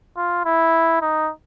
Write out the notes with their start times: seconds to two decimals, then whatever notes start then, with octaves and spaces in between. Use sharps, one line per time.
0.17 F4
0.45 E4
1.02 D#4